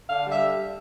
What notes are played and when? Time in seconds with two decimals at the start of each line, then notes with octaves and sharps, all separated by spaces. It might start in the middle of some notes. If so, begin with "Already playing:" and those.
0.10 D3 F5
0.26 G3 E5